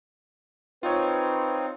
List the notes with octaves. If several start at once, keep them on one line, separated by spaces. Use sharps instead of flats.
C4 D#4 F4 B4 C#5